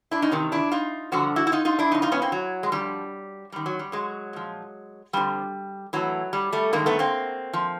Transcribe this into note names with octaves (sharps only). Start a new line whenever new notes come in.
D4 E4
C#4 D#4
E2 C3 D#3
D4 E4
D#4 F4
G2 D3 F3 F#4
E4 F#4
E4
D#4 F4
D#4 F4
D4 E4
F2 C#3 D#4
D#4 F4
B3 C#4
A#3 C4
F#3
G#3
G2 D3 F3 G3
F#2 D#3 G3
F#3
G3
F#3 G#3
A#2 F3
F2 D3 F3 G3
A2 E3 F#3
G3
G3 A3
G2 D#3 G#3 A#3
A3 B3
A#3 C4
F3